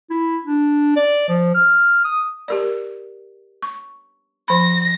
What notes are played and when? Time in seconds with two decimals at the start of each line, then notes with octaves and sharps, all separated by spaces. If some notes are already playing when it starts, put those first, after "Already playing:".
0.10 E4
0.45 D4
0.96 D5
1.28 F3
1.55 F6
2.04 D#6
2.48 G4 A#4 D5
3.62 C#6
4.48 F3 B5 A#6